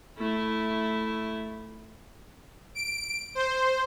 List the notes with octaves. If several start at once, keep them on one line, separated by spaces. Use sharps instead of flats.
A3 E4
D7
C5